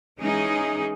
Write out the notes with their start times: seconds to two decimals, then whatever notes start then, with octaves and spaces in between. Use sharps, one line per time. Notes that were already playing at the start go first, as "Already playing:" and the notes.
0.20 E3 G#3 C#4 D#4 G#4